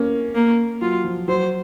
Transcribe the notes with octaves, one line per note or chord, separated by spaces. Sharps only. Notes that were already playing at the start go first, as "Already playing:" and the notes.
Already playing: A#3 C#4
A#3
F#3 F4
F3
F#3 C5